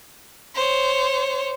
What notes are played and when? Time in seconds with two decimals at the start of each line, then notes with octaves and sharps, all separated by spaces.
0.55 C5 C#5